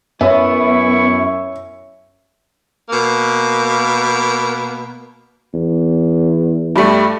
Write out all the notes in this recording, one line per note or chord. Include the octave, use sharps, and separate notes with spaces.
F#2 B3 E4 C#5 E5 C#6
B2 A#3
E2
G2 G3 A3